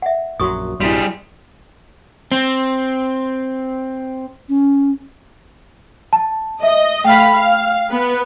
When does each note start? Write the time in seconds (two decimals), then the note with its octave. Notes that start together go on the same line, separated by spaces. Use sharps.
0.02 E5 F#5
0.40 A#1 F#2 F#3 F#4 C#6 D#6
0.81 A#1 G2 C3 G3 E4 F#4 G#4
2.32 C4
4.48 C#4
6.13 A5
6.63 D#5 E5
7.04 A3 F5 G5 B5
7.34 F5
7.91 B3 B4